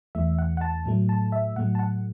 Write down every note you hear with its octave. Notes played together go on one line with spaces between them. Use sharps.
E2 E3 A3 E5
F#5
F#5
A5
A2 F#3 A3
A5
E5
A2 F#3 A3 F#5
A5
F#5